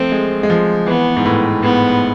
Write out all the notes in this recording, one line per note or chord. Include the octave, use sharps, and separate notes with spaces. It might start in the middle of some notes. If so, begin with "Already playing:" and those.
Already playing: F3 A3 C4
G#3
G#3
F3
E3 B3
G#2
A2
G#2 B3